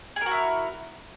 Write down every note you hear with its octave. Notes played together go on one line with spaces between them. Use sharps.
E4 F#4 G#4 A#4